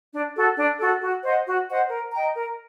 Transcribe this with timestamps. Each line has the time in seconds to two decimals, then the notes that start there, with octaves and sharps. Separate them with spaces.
0.12 D4
0.35 F#4 A4
0.57 D4
0.79 F#4 A4
1.02 F#4
1.23 C5 D#5 F#5
1.47 F#4
1.69 C5 D#5 F#5
1.90 A#4
2.13 D#5 G5 A#5
2.35 A#4